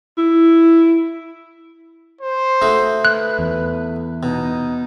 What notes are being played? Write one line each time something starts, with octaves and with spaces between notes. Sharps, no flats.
E4
C5
A3 D#4 F#4
B4 F#6
E2
B2 D#4